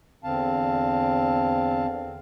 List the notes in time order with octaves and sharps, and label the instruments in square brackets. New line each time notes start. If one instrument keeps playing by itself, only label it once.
[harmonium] E2 D3 C4 F5 A5